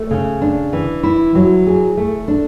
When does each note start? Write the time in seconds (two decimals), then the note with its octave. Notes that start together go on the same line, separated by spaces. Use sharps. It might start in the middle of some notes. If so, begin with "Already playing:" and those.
Already playing: A3
0.11 C#3
0.41 D4
0.73 E3
1.03 E4
1.35 F#3
1.67 G#4
1.97 A3
2.28 D4